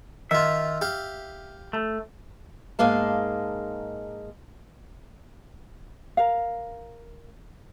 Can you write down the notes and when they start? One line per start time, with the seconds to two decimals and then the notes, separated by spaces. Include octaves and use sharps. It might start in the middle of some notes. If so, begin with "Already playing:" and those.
0.31 D#3 F4 E5
0.81 G4 F5
1.73 A3
2.79 G#2 G#3 A#3 F5 A5
6.17 A#4 F5